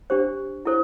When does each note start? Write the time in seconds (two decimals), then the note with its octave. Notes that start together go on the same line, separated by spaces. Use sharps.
0.10 D4 G4 C5
0.66 E4 A4 C5